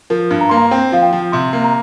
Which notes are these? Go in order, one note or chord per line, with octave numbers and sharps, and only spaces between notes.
F3 A#4
G2
A#5
A#3 C6
A#5
C4 G5
F3 F5
G5
F3
C3 C6
A#3
A#5